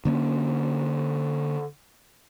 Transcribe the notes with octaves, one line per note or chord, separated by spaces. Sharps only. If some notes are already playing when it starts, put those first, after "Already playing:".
D3 A#3 B3 C#4